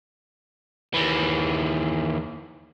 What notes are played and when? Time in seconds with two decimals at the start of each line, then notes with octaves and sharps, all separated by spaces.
0.94 D#2 E3